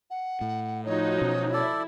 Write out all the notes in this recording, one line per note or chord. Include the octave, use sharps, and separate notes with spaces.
F#5
A2
F3 D#4 F#4 C#5
B2 C#4
E4 A4 D5